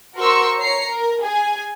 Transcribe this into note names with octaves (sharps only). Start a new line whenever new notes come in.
F#4 A#4 C5 C6 C#6 E6
C#5 A#5 C7 C#7
A#4
G#4 G#5